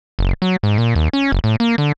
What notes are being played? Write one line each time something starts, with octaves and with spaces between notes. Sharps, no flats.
F#1
F#3
G#2
A#2
D#2
C#4
F#1
A2
A#3
D3